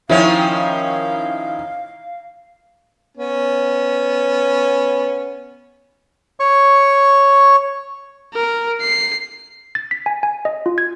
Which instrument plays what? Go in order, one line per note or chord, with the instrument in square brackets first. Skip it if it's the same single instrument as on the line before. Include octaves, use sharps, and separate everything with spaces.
[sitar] D#3 F3 C#4 [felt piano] E4 [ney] F5
[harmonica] B3 C#4
[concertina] C#5 C#6
[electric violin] A#4
C7
[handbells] A6
B6
G#5
G#5
D#5
F4
G#6